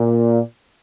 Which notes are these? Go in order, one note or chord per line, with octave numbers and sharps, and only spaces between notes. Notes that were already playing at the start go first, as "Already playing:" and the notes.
Already playing: A#2